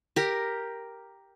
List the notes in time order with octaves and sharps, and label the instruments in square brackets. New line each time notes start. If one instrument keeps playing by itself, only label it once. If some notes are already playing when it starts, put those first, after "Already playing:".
[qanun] G4 A#4